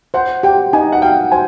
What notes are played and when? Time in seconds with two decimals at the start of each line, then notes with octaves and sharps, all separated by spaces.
0.14 C5 F#5
0.43 G4 G5
0.73 D#4 G#5
0.92 F#5
1.02 F5 G5
1.32 C5 G#5